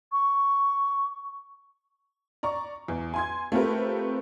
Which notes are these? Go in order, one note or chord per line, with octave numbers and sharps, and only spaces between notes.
C#6
D5 A#5 C#6
E2
G#5 C6 G#6
A3 C4 F4 G4 A#4 B4